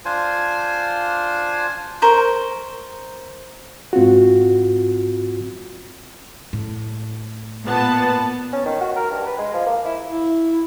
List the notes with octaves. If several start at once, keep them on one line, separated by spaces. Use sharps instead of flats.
D4 F4 C5 G#5
A#4 C5 C#6
G#2 C4 F4 F#4
A2
A#2 B3 A5
C#4
D#3
F#4
A#4
G2
B4
G#3
F3
A#3
E4
E4